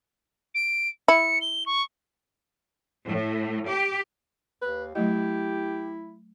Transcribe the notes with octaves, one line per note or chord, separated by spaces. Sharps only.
D7
E4 C#7
G7
C#6
A2
G4
D#2 B4
F#3 A3 E4 G4 D#5